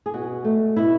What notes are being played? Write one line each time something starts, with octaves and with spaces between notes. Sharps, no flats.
G#4
B2 F#4
A3
B2 E4